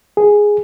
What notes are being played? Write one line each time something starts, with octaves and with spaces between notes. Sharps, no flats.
G#4